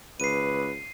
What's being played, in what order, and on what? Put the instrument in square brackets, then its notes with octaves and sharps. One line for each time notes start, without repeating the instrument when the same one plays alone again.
[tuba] C#2 [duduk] B4 [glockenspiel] C7 D#7